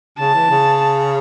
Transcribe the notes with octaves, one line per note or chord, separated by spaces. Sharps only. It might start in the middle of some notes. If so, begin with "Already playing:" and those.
C#3 A5
E3
C#3